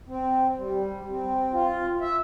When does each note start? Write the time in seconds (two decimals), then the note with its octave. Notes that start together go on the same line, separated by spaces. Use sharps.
0.08 C4
0.58 G3
1.09 C4
1.53 F4
2.01 E5